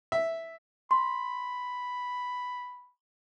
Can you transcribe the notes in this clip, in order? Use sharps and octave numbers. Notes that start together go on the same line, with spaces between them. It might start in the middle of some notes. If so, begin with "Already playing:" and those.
E5
B5 C6